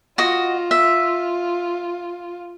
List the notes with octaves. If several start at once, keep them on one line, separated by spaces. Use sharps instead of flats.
F4 F#4 D#5
E5